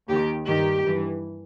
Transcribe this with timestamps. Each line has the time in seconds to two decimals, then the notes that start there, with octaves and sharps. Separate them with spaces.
0.10 D#2 D#3 G4
0.47 G2 D#3 G4
0.85 G2 E3